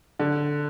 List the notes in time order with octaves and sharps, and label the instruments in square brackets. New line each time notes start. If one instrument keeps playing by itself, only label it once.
[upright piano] D3